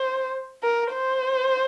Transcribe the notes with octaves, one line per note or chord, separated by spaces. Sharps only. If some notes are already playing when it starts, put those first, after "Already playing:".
Already playing: C5
A#4
C5